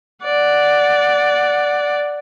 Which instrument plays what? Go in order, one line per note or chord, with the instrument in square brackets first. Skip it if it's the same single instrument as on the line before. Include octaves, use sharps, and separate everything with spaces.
[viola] D5 F#5